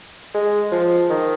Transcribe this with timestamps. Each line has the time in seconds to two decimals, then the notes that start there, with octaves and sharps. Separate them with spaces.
0.34 G#3
0.71 F3
1.10 D#3